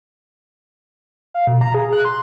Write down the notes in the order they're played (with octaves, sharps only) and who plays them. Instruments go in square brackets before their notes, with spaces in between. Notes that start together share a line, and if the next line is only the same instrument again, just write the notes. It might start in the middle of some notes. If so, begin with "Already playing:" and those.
[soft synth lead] F5
B2
A#5
G#4
F#6
C6